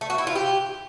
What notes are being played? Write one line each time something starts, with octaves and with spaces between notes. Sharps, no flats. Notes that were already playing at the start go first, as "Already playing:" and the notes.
A3
F#4
E4
F4
G4